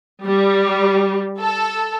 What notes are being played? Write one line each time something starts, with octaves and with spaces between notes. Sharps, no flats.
G3
A4